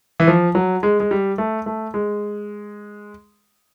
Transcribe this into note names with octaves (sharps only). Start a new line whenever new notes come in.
E3
F3
F#3
G#3
G#3
G3
A3
A3
G#3